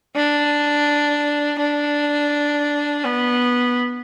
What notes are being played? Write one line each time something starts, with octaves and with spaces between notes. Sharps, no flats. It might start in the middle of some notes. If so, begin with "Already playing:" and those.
D4
D4
B3